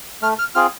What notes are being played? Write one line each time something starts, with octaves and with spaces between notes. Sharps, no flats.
A3 F6
F6
C4 F4 G#4 F6